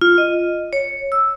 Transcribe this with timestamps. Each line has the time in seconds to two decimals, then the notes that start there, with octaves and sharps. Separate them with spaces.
0.01 F4
0.18 D#5
0.73 C#5
1.12 E6